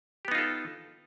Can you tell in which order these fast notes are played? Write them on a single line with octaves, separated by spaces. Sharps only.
G4 B3 D#4 F4 A4